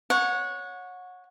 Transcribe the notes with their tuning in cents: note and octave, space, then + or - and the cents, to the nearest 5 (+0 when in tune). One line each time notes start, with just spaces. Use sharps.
C#5 +0 F#5 -25